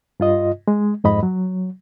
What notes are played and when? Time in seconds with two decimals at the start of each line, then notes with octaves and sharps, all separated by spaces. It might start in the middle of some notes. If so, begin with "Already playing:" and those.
0.20 G2 F4 D#5
0.68 G#3
1.04 F2 G#2 D#5 B5
1.23 F#3